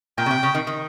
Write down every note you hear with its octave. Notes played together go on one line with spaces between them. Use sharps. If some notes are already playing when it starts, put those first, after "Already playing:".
A#2 G5
C#3
C3
C#3
D#3
D#3